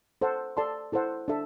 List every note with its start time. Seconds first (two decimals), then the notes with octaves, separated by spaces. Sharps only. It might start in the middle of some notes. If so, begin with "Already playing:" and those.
0.22 A4 C5 F#5
0.57 A4 D5 A5 C6
0.92 E4 A4 C5 F#5
1.28 D4 A4 E5